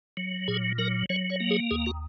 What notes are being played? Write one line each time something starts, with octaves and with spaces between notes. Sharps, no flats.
F#3
A#2 G#4
F#3 A#4
F#3 C#5
C#5
A#3
G#4
D#2 G#4
F#4